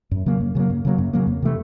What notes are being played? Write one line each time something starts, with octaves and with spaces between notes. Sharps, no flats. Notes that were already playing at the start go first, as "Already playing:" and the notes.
F#2
C#3 F#3 A#3
F#2
C#3 F#3 A#3
F#2
C#3 F#3 A#3
F#2
C#3 F#3 A#3
F2
C3 E3 A3